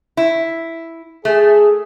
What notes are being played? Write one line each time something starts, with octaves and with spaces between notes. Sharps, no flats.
E4
A3 G#4